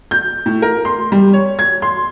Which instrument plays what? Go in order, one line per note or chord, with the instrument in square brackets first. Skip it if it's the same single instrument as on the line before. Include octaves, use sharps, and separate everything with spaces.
[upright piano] G6
A2
A#4
C6
G3
C#5
G#6
C6